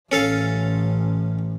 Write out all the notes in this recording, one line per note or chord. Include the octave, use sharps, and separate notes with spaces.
A1 C#4 A4 F5